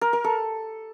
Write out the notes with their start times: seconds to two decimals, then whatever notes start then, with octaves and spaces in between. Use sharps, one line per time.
0.01 A#4
0.13 A#4
0.24 A4